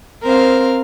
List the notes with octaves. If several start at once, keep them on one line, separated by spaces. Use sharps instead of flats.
C4 A#4 C5 F5